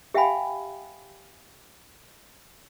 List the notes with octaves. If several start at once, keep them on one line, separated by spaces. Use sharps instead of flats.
G4 E5 F5 G5 G#5 B5